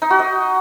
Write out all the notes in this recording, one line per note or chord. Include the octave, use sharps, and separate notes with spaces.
D#4
F#4
D#5